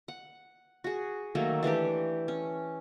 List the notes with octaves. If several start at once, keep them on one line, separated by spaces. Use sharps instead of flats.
F#5
F#4 G#4
D#3 F#3 A3 A#3
E3 A3 D4 G4
C#4